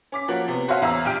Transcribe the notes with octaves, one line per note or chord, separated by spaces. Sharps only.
C#4 D6 B6
F3 A#3 F#4 C#5
C3 B3
F#4 C5 C#5 E5 F5 G#5
E2 F5 A#5 E6
A#1 G4 G5 F6 D7